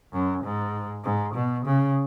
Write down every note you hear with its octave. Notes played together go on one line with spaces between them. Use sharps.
F#2
G#2
G#2
B2
C#3